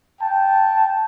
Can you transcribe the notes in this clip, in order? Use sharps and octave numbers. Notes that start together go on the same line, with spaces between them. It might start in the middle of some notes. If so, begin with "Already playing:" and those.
G5 A5